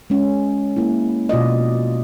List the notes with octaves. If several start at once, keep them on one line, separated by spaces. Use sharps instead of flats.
G#3 C#4
A#3 E4
B2 F4 D5 D#5